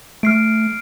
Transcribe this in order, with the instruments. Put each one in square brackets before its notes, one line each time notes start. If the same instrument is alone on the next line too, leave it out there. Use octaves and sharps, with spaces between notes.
[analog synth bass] A3 [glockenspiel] F6 C7 D7